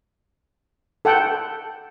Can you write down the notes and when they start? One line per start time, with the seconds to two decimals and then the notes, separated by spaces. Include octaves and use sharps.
1.05 A4 F#5 G5